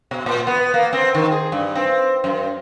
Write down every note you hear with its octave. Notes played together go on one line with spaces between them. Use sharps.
B2
A#2
B3
A#3
C4
D#3
G#4
G2
C4
F#2